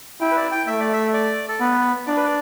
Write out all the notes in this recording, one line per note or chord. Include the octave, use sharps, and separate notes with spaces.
E4 G5
B4
D5
G5
A3 E5
D5
E5
D5
A4
B3 B4
D4 D5
B4
D5